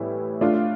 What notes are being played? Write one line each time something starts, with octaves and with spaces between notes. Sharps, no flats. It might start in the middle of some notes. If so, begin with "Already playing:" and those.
Already playing: A2 E3 G3 B3 E4
A3 D4 F4